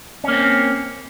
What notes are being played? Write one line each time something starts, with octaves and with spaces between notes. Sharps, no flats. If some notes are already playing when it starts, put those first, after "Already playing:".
A#3 C4 C#4